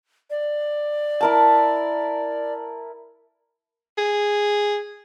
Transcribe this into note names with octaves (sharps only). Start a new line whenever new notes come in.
D5
E4 A#4 A5
G#4